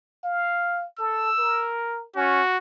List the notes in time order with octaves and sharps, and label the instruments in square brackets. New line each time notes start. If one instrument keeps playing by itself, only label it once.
[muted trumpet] F5
[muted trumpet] A4 [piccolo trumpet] E6
[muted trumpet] A#4
[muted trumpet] C#4 [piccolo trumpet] F#4